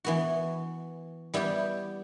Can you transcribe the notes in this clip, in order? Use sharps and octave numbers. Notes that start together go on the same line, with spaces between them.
E3 B3 F#4
G3 B3 E4 G4